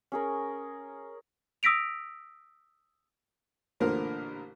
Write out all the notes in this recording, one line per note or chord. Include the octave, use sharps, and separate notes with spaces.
C#4 G#4 A#4
D#6 E6 A#6 B6 D7 F7
A1 A#2 D3 A#4 C5